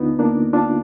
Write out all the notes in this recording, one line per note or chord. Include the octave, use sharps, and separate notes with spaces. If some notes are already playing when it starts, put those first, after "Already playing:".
Already playing: D2 D3 B3 D4 D#4 F4
A#3 D4
D4 F4